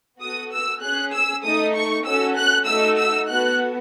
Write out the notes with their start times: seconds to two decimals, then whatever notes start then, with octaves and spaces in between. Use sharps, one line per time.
0.20 B3 F#4 A4 D#6
0.52 E6
0.82 C#4 G#4 F#6
1.13 E6
1.44 A3 D#4 A4 D#6
1.75 C#6
2.05 C#4 F#4 A4 E6
2.36 F#6
2.67 A3 D#4 F#4 A4 E6
2.98 E6
3.28 B3 F#4 A4 F#6